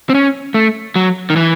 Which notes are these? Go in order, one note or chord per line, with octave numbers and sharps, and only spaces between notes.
C4
C#4
A3
F#3
D#3
E3